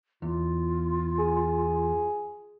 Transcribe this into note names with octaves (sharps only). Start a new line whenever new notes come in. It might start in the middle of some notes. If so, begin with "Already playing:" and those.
E2 F4
G#4